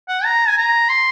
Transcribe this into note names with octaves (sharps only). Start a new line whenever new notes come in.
F#5
A#5
G#5
A#5
C6